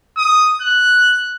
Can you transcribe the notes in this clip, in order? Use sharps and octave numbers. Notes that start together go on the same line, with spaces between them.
D#6
F#6